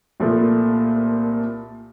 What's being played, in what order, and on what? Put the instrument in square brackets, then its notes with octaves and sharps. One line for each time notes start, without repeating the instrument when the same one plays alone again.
[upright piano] C2 A#2 F3 A3